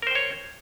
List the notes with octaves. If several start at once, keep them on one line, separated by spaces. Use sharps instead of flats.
A#4 C5 C#5 G5